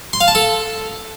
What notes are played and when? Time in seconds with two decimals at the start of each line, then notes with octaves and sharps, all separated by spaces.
0.13 C6
0.21 F5
0.28 A5
0.35 A4